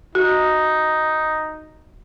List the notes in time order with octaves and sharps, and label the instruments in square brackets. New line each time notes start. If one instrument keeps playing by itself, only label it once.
[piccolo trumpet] D#4 [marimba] F#4